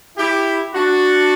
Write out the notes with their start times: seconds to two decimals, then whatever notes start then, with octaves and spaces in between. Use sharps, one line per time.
0.18 E4 G4
0.74 D4 F#4